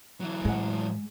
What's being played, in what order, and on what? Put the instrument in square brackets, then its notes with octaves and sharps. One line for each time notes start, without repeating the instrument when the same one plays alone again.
[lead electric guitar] E3 F#3
[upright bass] A2 [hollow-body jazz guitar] G#3 F#5